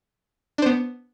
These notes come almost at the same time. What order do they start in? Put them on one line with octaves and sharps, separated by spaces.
D4 C5 B3